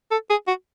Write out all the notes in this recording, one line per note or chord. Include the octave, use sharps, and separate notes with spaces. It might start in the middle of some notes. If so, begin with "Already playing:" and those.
A4
G#4
F#4